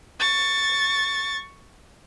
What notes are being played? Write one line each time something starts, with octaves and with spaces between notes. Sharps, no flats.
C#6 A6